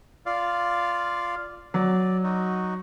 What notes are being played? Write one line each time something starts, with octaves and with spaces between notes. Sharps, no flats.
F4 D5 F5
F#3 D5
D#4 F#4